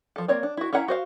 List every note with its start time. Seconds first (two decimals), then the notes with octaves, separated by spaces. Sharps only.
0.16 F3 A4
0.28 A#3 C4 C#5 D5
0.43 D4
0.57 E4 F#4
0.73 C#4 E4 F5 F#5 A#5
0.88 F#4 C5 F5